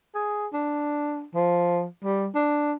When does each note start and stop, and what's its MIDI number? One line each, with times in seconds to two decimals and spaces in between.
0.15 0.47 68
0.53 1.24 62
1.35 1.86 53
2.04 2.28 55
2.35 2.74 62